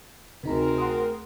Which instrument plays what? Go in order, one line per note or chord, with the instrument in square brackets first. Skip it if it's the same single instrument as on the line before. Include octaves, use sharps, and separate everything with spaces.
[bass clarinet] D2 [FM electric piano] C3 D#4 A#5 [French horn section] C4 G#4 A#4
[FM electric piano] F#5 C6 D#6